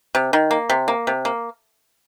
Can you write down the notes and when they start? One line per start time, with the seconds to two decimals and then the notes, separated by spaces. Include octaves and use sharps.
0.15 C3
0.33 D#3
0.51 A#3
0.70 C3
0.88 A#3
1.07 C3
1.25 A#3